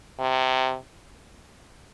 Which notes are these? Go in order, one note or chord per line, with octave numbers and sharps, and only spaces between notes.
C3